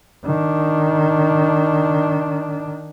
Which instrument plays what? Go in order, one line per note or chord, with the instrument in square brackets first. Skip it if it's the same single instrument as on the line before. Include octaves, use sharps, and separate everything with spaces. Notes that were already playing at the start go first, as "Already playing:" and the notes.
[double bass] D#3 D4